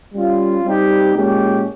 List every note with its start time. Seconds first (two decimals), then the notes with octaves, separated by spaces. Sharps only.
0.14 G3 C#4 F4
0.64 G3 C4 D#4 G4
1.14 A#2 G#3 C#4 G4